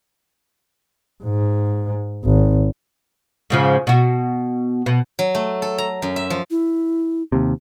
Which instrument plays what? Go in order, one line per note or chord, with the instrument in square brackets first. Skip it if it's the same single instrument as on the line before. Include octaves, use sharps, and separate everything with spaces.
[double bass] G#2
G#1
[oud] G#2 C#3 F3
B2 F#4
B2
[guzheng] F#3
A3
A4
A#5
F#2
E5
F3
[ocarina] E4
[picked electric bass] D#2 C3